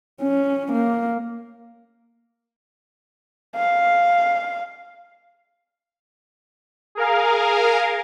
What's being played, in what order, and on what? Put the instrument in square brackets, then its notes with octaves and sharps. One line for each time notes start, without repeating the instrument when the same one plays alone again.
[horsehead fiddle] C#4
A#3
[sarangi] F5
[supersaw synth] G#4 A#4 F5